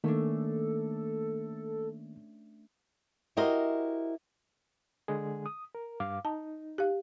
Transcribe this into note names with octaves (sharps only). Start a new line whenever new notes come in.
D#3 A3 A#3 C#4 D4 A4
E4 F#4 G4 A#4 C5 D#5
D3 G#3 G#4
D#6
A#4
G2 F5 D6
D#4 A5
G4 F5